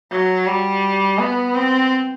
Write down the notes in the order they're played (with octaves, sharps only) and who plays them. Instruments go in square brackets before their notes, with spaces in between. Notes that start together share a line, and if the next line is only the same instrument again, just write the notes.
[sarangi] F#3
G3
B3
C4